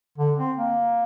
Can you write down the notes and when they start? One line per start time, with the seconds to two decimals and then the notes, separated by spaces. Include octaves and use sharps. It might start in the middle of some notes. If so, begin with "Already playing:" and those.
0.18 D3
0.38 C4
0.57 A#3